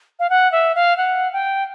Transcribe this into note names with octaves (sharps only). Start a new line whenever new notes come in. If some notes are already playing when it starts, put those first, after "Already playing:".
F5
F#5
E5
F5
F#5
G5